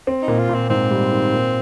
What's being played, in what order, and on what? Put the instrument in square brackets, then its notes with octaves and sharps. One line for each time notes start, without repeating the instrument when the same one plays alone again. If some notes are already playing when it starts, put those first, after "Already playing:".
[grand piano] C4
[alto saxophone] D#4
[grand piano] A#2
[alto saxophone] F4
[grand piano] A#2
[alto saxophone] C4
[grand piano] G#2 [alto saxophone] C4
[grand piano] G3
D#3
A#2